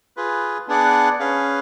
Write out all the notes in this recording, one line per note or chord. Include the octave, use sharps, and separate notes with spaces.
F4 G#4 B4
B3 D4 G#4 D5 F#5
C#4 G#4 B4 F5